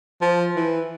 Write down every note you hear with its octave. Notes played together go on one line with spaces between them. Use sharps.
F3
E3